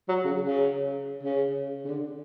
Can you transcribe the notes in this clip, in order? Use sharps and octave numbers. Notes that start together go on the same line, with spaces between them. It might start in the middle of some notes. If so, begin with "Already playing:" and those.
F#3
C#3
C#3
C#3
C#3
D3